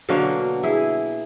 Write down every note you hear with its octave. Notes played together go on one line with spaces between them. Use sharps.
B2 D3 F#3 A#3
E4 G#4